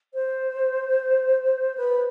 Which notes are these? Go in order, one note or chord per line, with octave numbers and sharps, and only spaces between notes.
C5
B4